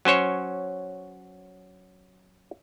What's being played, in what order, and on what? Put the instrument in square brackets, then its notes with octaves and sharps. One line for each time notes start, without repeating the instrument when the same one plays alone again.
[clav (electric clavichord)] F#3 C#4 C5 C#5